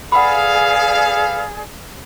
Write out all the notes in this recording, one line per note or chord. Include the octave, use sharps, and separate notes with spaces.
G#4 A4 B4 D5 F5 F#5 B5